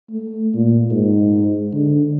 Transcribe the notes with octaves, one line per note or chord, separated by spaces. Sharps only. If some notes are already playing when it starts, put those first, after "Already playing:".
A3
A#2
G#2
D3